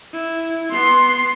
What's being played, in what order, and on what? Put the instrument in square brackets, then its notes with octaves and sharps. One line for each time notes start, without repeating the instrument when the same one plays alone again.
[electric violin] E4
[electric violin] B3 C7 [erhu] C6